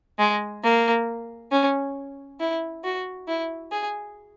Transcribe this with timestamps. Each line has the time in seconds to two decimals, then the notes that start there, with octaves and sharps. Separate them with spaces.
0.19 G#3
0.64 A#3
1.52 C#4
2.40 E4
2.84 F#4
3.28 E4
3.72 G#4